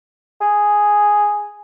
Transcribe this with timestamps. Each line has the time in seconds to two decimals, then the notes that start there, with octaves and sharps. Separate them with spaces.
0.41 G#4